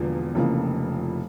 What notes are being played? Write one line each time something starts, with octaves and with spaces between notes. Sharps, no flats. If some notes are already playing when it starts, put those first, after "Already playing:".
Already playing: E1 E2 D3 F3 A#3
F1 F2 C#3 E3 A#3